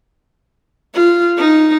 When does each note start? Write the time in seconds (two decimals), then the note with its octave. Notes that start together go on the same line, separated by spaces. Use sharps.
0.94 F4
1.37 D#4